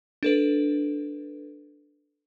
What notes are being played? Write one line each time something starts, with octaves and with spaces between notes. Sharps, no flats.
D4 A4 B4